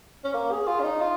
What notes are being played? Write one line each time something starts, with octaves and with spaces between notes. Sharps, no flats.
C#4
A#3
G#4
F4
C#4
D#4
F4